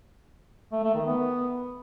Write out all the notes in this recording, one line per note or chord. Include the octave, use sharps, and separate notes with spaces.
A3
A3
D#3
B3